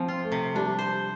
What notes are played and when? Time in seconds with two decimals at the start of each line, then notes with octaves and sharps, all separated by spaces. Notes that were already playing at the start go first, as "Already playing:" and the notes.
Already playing: F3 C4
0.08 F4
0.24 A3
0.32 C3
0.55 G3 D4
0.79 C5